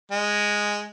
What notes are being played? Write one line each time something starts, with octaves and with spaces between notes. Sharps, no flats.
G#3